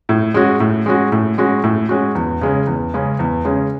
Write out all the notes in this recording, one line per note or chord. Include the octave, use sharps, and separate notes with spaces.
A2
G#3 C#4 F#4
A2
G#3 C#4 F#4
A2
G#3 C#4 F#4
A2
G#3 C#4 F#4
E2
C#3 G#3 C#4
E2
C#3 G#3 C#4
E2
C#3 G#3 C#4